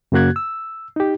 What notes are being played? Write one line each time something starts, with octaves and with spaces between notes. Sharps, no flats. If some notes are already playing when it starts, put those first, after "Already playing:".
F#2 C#3 A#3 F#4 F#6 G#6
E6
D#4 G4